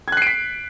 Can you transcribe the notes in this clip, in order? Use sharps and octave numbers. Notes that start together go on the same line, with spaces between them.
F#6 G#6 B6 C7 D7